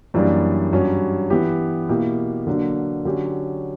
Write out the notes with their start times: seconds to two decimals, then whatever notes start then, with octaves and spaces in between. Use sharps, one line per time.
0.14 F#2 E3 G3 A#3 D4
0.73 G2 F#3 C#4
1.30 E3 B3 E4 G4
1.89 B2 A#3 E4 G4
2.47 D3 F#3 A#3 D4
3.05 D3 F#3 C#4 G4